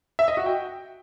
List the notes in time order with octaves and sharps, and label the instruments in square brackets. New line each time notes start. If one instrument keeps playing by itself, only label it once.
[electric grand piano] E5
D#5
F#4
G5